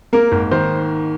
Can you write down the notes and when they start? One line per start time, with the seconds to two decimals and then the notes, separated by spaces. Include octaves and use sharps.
0.13 A#3 A#4
0.32 G#1
0.51 D#3 C5